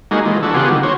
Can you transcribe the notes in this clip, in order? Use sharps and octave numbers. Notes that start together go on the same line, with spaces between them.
G3 G#3 A#3 D#4 F#4 G#4
E3 F3 G#3
E3 D4 F#4 A4
C#3 B3 F4 G4 G#4 F#5
D3 D#3 G3
F#4 C5 C#5